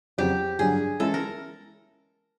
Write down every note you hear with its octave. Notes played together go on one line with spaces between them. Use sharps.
F2 C#3 F#3 G4
G2 D3 F#3 G#4
E3 G#3 C#4 E4 A4
A#4